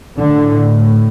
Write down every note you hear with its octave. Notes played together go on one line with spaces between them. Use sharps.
A2 D3